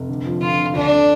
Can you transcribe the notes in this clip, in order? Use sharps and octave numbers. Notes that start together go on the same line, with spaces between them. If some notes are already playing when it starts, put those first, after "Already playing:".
Already playing: F1
D3
F3
D3 F4
D3
D2 D4
D3